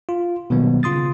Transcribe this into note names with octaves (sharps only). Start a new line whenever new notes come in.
F4
B2 D#3 F#3 G3 A#3 B3
C#3 F4 C6 D#6 A6